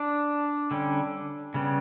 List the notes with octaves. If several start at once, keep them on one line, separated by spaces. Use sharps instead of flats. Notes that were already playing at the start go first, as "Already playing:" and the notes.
Already playing: D4
D3 G3 C#4
C#3 G3 B3